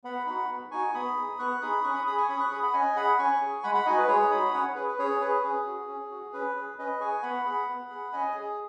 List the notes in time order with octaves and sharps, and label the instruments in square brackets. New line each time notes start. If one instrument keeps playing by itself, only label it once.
[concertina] B3 F#5 B5
D#4 F#4 F#5 B5
B3
D#4 F#4 G#5 C#6
B3 B5 D#6
D#4 G#4
B3 C#6 F#6
D#4 G#4 B5 D#6
C#4 C#6 F#6
B5 D#6
G#4 B5 D#6
G#5 C#6
C#4 B5 D#6
C#6 F#6
G#4 B5 D#6
F#5 B5
C#4 D#5 G#5
G#4 F#5 B5
C#4 G#5 C#6
G#4
G#3 F#5 B5
F#5 B5
D#4 F#4 D#5 G#5
B4
G#3 G#4 C#5
D#4 F#4 B5 D#6
C#4 C#5 F#5
G#4 B4
B4
C#4 G#4 C#5
G#4 B4
C#4 G#4
F#4
C#4
F#4
C#4 B4
G#4
C#4 B4 D#5
G#4 G#5 C#6
B3 F#5 B5
G#4 F#5 B5
B3
G#4
C#4 D#5 G#5
G#4